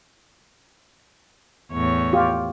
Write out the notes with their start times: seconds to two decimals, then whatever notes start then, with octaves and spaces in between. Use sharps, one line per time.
1.72 E2 A2 C#5
2.13 F4 G4